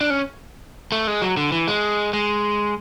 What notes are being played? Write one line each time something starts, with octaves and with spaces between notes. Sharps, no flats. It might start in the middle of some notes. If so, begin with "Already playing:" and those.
D4
C#4
A3
G#3
F#3
D3
E3
G#3
G#3